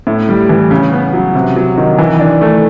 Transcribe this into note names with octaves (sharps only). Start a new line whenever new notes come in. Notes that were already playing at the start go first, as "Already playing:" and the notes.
A2
G3
E3
C#3
B3
F#3
C3
F#3
D#3
E3
D4
A3